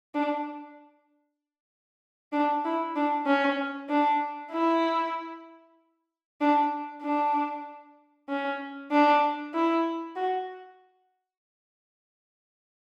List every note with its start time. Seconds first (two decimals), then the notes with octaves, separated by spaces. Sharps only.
0.14 D4
2.33 D4
2.65 E4
2.96 D4
3.27 C#4
3.89 D4
4.52 E4
6.41 D4
7.03 D4
8.29 C#4
8.91 D4
9.54 E4
10.16 F#4